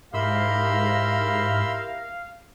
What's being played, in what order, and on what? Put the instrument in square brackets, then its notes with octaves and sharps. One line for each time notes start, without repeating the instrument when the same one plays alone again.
[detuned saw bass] G#2 [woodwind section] E4 G4 A#4 [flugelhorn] F5 [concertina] B5 C6 E6